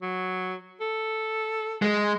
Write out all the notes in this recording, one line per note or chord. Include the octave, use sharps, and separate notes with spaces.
F#3
A4
G#3